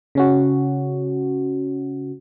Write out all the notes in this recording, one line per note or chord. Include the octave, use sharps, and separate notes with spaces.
C#3 C#4 F#4